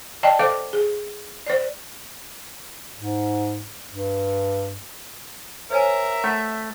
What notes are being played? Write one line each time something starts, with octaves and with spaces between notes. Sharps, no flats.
D5 D#5 G5 A5
A4 C5 F5 D6
G#4
C5 D5
G#2
G2
A#4 C5 C#5 E5 G#5
A3 F#5